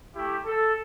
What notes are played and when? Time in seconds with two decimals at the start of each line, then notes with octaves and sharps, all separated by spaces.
0.15 A3 E4 G4
0.46 A4